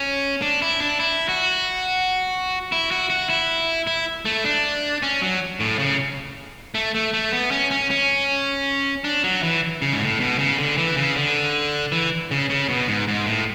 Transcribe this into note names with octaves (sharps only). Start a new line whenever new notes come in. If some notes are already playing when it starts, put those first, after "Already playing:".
Already playing: C#4
D4
E4
D4
E4
F#4
E4
F#4
F#4
E4
E4
A3
D4
C#4
F#3
A2
C#3
A3
A3
A3
B3
C#4
C#4
C#4
D4
F#3
E3
C#3
G#2
A2
B2
C#3
D3
E3
C#3
D3
E3
C#3
C#3
B2
G#2
G#2
A2